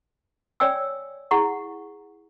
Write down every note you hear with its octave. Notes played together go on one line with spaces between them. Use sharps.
C#5 D5 G5 G#5 E6
E4 G#4 F#5 A#5 C#6